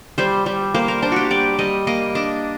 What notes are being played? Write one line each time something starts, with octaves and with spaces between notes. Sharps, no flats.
G3 C5
G3
A#3 C5
A#4
D4 C5
F#4 G4
G3 D5
G3 D#5
A#3 D#5
D4 D#5